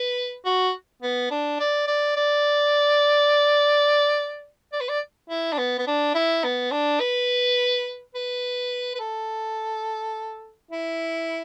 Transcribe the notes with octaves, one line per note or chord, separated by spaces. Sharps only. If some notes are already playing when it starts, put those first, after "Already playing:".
Already playing: B4
F#4
B3
D4
D5
D5
D5
D5
B4
D5
E4
D4
B3
B3
D4
E4
B3
D4
B4
B4
B4
A4
E4